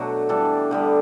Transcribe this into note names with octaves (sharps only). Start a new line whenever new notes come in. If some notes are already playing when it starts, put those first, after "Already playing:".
Already playing: B2 F#3 A3 D4 F#4
E3 G3 D4 A4
D3 G3 B3